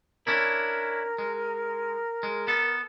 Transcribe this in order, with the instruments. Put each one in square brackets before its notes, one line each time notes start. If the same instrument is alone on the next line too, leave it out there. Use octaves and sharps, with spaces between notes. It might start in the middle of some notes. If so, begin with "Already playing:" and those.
[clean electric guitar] C#4 D4 E4 [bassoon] A#4
[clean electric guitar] G#3
G#3
B3 A4